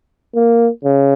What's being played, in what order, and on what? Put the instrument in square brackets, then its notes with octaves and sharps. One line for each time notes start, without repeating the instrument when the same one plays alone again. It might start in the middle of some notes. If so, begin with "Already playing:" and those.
[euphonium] A#3
C#3